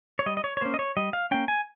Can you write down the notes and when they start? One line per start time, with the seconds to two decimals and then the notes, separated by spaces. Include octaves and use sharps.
0.19 C#5
0.26 G3 D#5
0.37 D#5
0.44 C#5
0.57 C#5
0.61 A#3 C#4 C5
0.74 D#5
0.79 C#5
0.97 G3 D#5
1.13 F5
1.31 A#3 C#4 G5
1.48 G#5